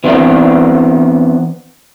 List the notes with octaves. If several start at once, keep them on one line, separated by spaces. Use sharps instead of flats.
E3 B3 C4 D4